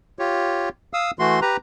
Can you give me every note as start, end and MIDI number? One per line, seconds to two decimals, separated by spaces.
0.19 0.69 65
0.19 0.69 67
0.19 0.69 73
0.93 1.11 77
0.93 1.11 87
0.93 1.11 88
1.19 1.40 52
1.19 1.40 57
1.19 1.40 66
1.19 1.40 84
1.42 1.57 67
1.42 1.57 71
1.42 1.57 82